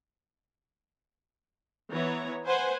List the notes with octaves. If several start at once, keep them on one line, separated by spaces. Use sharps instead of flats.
E3 B3 C#5 A#5
B4 C5 F#5 G#5